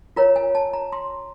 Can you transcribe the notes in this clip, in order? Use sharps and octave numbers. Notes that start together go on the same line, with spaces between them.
F4 A#4 C#5 A#5
G#5
A5
A#5
C6